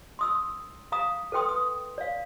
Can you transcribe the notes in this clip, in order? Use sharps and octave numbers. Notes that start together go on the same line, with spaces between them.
C6 D#6 E6
F5 A#5 D#6
A4 B4 G5 C6 D#6
D#6
D5 F5